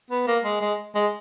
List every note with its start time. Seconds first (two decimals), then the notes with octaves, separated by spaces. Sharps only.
0.10 B3
0.27 A#3
0.44 G#3
0.61 G#3
0.95 G#3